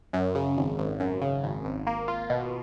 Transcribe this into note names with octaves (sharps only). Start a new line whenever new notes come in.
F#2
C#3
G#1
G#1
F#2
C#3
G#1
G#1
A#3
F4
B2